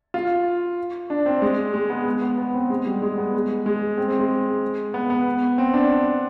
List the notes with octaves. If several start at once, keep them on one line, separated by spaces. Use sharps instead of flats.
F4
D4
C4
G#3
G#3
B3
B3
B3
C4
G#3
G3
G#3
B3
G#3
G#3
C4
C4
G#3
B3
B3
C4
D4